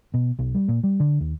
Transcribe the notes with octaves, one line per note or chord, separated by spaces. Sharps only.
B2
B1
G3
A#2
G3
D3
D#2